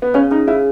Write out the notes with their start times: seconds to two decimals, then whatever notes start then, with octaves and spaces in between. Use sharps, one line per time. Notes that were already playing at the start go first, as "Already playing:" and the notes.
0.02 B3
0.14 C#3 C#4
0.31 C#3 D#4
0.47 C#3 E4